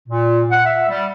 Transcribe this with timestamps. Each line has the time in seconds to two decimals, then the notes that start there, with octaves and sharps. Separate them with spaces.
0.09 A#2
0.51 F#5
0.66 E5
0.89 G3